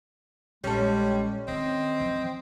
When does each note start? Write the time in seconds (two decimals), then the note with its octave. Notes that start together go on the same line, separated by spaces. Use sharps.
0.64 A#1 G3 G#3 C#4 A4
1.48 D#3 C4 D#4 D#5
2.00 E3 F3